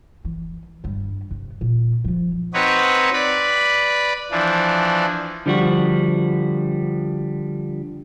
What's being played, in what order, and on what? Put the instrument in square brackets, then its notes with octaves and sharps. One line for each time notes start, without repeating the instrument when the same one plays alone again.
[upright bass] E3
G2 G3
C3
A#2
F3 F4
[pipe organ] C4 D#4 F#4 B4 C#5
B4 D5 B5
E3 F3 D4
[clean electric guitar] D3 F3 G3 F#4